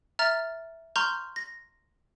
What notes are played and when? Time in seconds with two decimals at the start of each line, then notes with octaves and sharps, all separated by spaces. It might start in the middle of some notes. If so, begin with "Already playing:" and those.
0.19 E5 A#5 F6 A6
0.96 A#5 C6 C#6 F6 G6
1.36 A#6